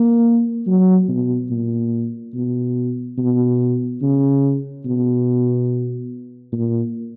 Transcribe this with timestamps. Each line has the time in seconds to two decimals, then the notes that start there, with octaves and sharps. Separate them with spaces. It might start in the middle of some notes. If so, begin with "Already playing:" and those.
Already playing: A#3
0.67 F#3
1.08 B2
1.50 A#2
2.34 B2
3.18 B2
4.02 C#3
4.85 B2
6.53 A#2